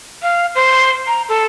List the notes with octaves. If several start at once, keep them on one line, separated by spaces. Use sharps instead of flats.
F5
C5
A#5
A4